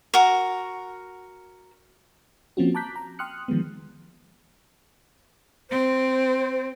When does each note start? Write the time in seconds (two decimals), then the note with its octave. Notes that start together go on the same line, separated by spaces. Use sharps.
0.14 F#4 A#4
2.57 F3 A#3 C4 C#4 F4 F#4
2.75 A5 A#5 D6 F#6 G6 B6
2.96 A#5
3.19 G5 C6 D#6 F6 F#6 C#7
3.48 D#3 F3 G#3 B3
5.71 C4 C5